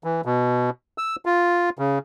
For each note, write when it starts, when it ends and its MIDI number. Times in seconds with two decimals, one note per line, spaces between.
0.04 0.21 52
0.25 0.70 47
0.98 1.16 88
1.25 1.70 65
1.79 1.99 49